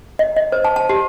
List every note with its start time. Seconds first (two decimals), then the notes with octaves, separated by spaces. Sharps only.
0.19 D#5
0.37 D#5
0.52 C5
0.65 A5
0.76 A5
0.89 G4